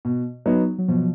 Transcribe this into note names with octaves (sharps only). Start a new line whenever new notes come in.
B2
F#3 B3 D#4
F#3
B2 F3